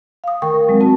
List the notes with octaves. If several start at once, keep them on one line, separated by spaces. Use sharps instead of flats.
F5 D#6
D#3 A3 A#4 G5 C#6
A#4
F#3 G#3 C4
C4 F#4 A#4 A5